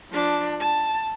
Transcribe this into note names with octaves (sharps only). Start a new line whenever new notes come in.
F3 D4
A5